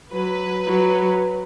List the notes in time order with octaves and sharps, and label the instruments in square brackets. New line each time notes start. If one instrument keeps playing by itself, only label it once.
[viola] F#3 [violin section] B4
[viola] F#3